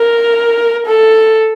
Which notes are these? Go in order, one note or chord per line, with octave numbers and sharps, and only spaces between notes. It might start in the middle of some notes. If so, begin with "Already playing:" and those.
Already playing: A#4
A4